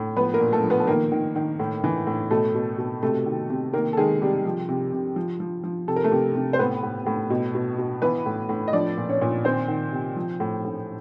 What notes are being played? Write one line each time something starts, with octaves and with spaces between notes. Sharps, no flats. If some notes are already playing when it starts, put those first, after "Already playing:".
Already playing: A2
F3 B3 B4
A#3 A#4
A#2
A3 A4
F3
B3 B4
A4
D#3 A#3 A#4
D#3
D#3
A2
E3
A2
B2 A3 A4
B2
B2
C3 A3 A4
D#3
C3
D#3 A#3 A#4
A4
D#3 G#3 G#4
C3 G3 G4
F3
C3
C3
F3
F3
F3
C3 A4
A#4
A3 A4
C3
C3
C5
A2 B3 B4
A2
A2
B2
B2
B2
E3 B3 B4
A2
A2
D#5
F3 D4 D5
A#2
C#4 C#5
A#2
D#3 C4 C5
D#3
C3
F3
A2
A2